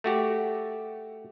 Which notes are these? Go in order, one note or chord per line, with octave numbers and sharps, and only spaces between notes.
A3 F#4 G4